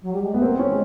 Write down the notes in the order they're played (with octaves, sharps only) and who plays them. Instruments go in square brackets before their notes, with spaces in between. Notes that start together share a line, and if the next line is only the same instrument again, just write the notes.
[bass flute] F#3
G3
G#3
[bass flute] A3 [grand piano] B3
[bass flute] A#3 [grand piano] C4
[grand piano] C#4
[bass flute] G#3